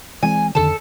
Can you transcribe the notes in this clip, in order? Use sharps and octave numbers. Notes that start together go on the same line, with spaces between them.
E3 G#3 C4 G#5
F2 D3 D#3 A4 A5